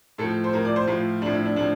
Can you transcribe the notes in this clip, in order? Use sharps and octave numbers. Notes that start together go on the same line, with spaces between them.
A2 F3 A4
C5
A2 F3 A#4
D5
C5
A2 F3 F4
A2 F3 D4
E4
D4
A2 F3 D4